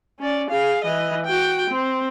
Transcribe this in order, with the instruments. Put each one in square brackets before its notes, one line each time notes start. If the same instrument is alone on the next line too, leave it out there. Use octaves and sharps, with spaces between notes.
[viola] C#4 D5
G#4 F5
E3 D#5
F#4 G5
C4